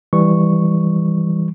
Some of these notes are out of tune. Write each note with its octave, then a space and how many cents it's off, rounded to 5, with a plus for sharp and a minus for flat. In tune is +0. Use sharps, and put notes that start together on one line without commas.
E3 +0 G3 +10 C#6 -5